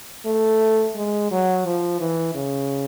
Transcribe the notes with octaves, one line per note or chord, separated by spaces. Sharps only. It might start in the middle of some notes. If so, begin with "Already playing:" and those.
A3
G#3
F#3
F3
E3
C#3